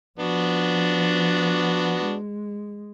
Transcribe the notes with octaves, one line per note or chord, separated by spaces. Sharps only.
F3 B3 D4 F#4
G#3